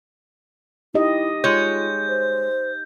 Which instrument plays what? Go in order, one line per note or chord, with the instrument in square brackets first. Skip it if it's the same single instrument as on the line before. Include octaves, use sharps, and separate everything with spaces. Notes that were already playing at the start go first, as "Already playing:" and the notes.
[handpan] D#4 G4 D#5 [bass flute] E4
[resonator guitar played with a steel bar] G#3 C#5 [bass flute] F4 [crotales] G6
[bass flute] C5